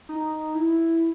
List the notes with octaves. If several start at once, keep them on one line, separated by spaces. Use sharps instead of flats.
D#4
E4